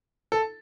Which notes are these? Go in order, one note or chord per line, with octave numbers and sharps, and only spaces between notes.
A4